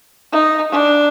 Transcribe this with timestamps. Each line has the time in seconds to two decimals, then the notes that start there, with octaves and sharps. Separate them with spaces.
0.32 D#4
0.71 D4